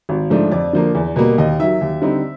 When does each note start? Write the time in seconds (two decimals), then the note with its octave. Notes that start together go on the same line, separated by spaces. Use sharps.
0.09 G#1
0.30 G#2 F3 A3 D4
0.51 F2 D5
0.73 D3 F3 A#3
0.95 E2
1.16 B2 G3 A#3
1.38 D#2 D#5
1.60 D#3 F#3 E5
1.81 D#2
2.02 D3 G3 C4 D#4